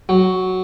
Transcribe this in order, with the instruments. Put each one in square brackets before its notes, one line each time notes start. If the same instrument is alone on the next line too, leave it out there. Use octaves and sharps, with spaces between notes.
[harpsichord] F#3